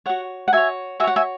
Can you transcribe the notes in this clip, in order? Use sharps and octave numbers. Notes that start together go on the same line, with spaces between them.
F#4 C#5 F#5
F#5
F#4 C#5 E5 G#5
F#4 C#5 E5 F#5 G#5
E5 G#5